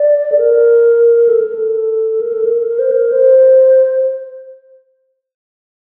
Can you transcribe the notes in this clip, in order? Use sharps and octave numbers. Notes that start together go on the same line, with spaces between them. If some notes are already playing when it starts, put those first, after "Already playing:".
Already playing: D5
A4
A#4
A4
A#4
A4
A#4
A4
A#4
A#4
C5
A#4
C5